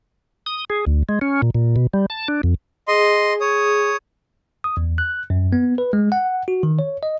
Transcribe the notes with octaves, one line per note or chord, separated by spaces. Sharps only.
D#6
G#4
D2
G#3
C#4
A#2
A#2
B2
G3
A5
D4
F2
G#4 D#5 C6
C#5 D#6
D#6
E2
F#6
F#2
B3
B4
G#3
F#5
F#4
D#3
C#5
D#5